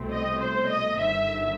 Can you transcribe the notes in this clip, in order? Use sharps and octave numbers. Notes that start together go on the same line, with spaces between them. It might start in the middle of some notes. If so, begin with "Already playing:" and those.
Already playing: C2 B2 A3 C4
D#5
C5
D#5
G1 G2 D#3 E5